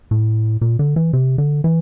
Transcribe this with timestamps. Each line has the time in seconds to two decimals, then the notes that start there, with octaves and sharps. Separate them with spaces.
0.11 A2
0.61 A#2
0.79 D3
0.96 E3
1.13 C3
1.38 D3
1.64 E3